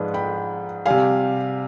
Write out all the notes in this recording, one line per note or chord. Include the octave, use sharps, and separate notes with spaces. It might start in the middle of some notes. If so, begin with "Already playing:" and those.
Already playing: G#2 F3 G#3 B4 D5 D#5
G5 B5
C3 G3 F5 G#5